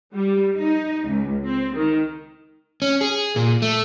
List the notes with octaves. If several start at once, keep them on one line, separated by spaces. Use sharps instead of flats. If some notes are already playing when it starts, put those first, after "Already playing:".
G3
D#4
C#2
C4
D#3
C#4
G#4
A#2
A3